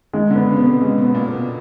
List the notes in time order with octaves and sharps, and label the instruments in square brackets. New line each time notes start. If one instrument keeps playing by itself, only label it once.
[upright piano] D#3 [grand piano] G#3
[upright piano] D3
[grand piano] B3
[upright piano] C#3
[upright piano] B2 [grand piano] B3
[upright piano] C3
[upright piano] C#3 [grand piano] G#3
[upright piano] B2
[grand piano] B3
[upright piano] A#2
[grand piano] B3
[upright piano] B2